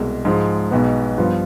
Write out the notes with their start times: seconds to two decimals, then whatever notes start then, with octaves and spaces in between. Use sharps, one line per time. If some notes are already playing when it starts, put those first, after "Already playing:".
Already playing: C2 B2 G#3
0.25 G#2 F3 G#3
0.71 B1 B2 G#3 B3
1.18 G2 F3 B3 F4